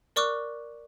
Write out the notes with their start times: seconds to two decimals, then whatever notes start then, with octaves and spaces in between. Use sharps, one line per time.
0.16 A#4 D5 C#6 D6 F6 F#6